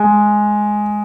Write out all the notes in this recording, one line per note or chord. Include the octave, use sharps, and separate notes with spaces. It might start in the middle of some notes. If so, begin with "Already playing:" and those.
Already playing: G#3